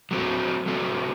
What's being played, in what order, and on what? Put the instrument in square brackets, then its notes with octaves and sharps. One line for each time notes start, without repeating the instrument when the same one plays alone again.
[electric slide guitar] F#3 A3 C4
F#3 A3 C4